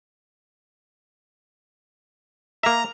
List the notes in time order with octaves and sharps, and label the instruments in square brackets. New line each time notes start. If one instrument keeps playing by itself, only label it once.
[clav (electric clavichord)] A#3 E5 [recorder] A#5